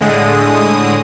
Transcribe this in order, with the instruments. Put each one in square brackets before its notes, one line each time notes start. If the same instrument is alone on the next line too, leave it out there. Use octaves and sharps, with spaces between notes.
[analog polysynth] A2 D3 G#3 D#6